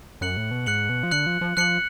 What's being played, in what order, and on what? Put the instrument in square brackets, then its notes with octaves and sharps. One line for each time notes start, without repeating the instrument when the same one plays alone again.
[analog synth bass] F#2 [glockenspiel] F#6 C#7 F#7
[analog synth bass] A2
B2
[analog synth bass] G#2 [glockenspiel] F#6 C#7 F#7
[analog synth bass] B2
F3
[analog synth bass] D3 [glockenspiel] F#6 C#7 F#7
[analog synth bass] F3
F3
[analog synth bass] F3 [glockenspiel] F#6 C#7 F#7